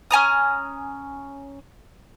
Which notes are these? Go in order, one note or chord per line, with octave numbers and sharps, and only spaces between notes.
C#4 G#5 A#5 D#6